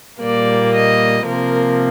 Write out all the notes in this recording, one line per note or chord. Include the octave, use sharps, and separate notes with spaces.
A#2 G3 A#3 D5
D#5
C3 F3 A#3 A#4